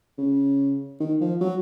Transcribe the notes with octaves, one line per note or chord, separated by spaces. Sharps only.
C#3
D#3
F3
F#3